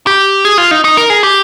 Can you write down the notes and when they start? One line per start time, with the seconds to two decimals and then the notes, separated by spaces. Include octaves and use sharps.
0.07 G4
0.45 G#4
0.58 F4
0.71 D#4
0.84 D#4
0.97 A#4
1.10 G#4
1.23 G4